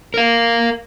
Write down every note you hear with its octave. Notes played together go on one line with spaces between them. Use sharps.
A#4 F5